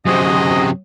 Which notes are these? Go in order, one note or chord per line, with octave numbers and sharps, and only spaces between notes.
F#2 C3 C4 F#4 G#4 D#5